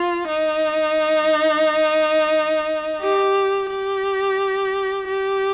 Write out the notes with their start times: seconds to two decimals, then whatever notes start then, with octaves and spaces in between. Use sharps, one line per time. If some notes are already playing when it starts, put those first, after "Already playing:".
Already playing: F4
0.27 D#4
3.02 G4
3.70 G4
5.08 G4